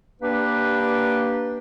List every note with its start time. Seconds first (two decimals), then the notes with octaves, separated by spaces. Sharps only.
0.21 A#3 D4 G4 B4